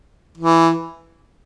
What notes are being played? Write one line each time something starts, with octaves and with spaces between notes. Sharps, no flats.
E3